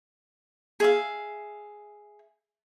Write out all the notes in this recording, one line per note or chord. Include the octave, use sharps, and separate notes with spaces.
G#4 E5 F5